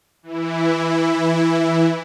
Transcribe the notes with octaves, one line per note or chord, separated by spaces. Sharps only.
E3 E4